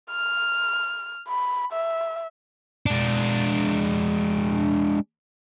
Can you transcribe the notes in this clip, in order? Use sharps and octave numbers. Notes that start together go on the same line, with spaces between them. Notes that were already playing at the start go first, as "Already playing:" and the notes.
F6
B5
E5
G#3 D4